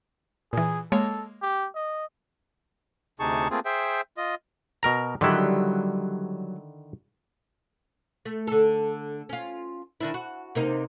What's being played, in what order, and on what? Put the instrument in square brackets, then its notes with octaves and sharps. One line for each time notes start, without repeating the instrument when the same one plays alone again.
[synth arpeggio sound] A#2 E3 [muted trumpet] G#4
[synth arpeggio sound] G#3 A#3 C#5 [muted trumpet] A4
[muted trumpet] G4
D#5
[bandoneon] D2 C3 D#4 G#4 A5 C#6
A3 A#3 C4 F4 G#4
G#4 C5 E5 G5
F4 D#5
[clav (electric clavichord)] B2 A#4 A#5
[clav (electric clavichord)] D3 D#3 E4 [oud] F#3 G3
[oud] A3
D3 A4
C#4 F4
D#3 D4 E4
F#4
C3 A#3 D#4